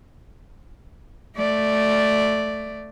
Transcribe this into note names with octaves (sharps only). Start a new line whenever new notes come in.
A3 D5